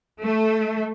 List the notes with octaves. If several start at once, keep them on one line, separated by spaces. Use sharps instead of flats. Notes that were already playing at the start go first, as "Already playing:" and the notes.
A3